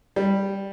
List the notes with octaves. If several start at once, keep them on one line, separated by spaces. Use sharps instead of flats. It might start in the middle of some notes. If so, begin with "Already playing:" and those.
G3